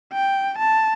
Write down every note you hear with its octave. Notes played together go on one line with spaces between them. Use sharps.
G5
A5